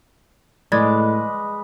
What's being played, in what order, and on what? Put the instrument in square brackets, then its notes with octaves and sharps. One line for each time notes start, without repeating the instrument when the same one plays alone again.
[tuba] A2 [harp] G#3 [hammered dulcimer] B4 D#5 D6 [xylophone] D5 G#6